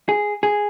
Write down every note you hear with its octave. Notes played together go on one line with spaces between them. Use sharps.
G#4
G#4